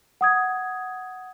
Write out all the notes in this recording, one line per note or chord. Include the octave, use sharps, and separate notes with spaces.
F#5 D#6 G#6